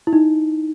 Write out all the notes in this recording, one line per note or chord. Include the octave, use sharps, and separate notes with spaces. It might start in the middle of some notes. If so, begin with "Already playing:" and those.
E4
D#4